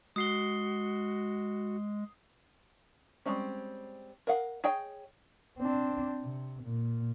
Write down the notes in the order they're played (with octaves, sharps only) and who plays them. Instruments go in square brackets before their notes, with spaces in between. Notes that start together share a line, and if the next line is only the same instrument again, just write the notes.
[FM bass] G#3 [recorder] F#4 [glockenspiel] D#6 C7 G7
[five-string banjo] G3 G#3 C4 C#4
A#4 D#5 F5 F#5
G#4 C#5 D#5 G5
[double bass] C4 D4
C3
A#2